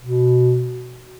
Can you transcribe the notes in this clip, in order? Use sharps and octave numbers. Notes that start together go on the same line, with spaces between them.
B2